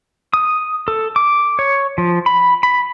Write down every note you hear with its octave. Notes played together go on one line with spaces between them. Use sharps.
D#6
A4
D6
C#5
F3
B5
B5